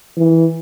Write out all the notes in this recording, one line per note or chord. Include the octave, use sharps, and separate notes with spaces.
E3